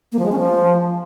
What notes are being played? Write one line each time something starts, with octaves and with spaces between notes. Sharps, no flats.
A#3
F3
G#3
C#4
F3